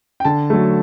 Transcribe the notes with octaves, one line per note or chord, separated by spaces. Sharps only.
G5
D3 A5
F#3 A3